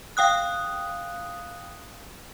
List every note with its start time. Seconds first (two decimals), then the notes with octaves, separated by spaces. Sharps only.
0.17 F5 G5 D#6 F#6